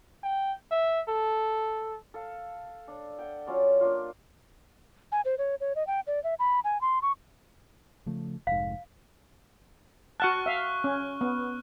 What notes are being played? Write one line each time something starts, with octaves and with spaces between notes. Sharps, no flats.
G5
E5
A4
A4 F5
D4
F#5 G5
F#3 C#4 F4 D5
A#3 D4 F4
G#5
C5
C#5
C#5
D#5
G5
D5
E5
B5
G#5
C6
C#6
C#3 F3 A3
F1 G#2 F5
F#4 F#5 A5 C#6 F6 F#6
E5 F5
C#4
B3